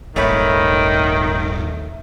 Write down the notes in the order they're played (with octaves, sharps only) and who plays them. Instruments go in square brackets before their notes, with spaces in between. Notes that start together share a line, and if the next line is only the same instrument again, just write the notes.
[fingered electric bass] D#1 G#1 [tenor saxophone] D#3 [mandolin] A3 C#5 B5